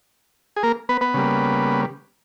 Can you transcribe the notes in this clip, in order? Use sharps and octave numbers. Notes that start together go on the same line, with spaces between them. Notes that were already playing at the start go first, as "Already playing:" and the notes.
G#4
A#3 A#4
B3 B4
B3 B4
C#3 G3 A#3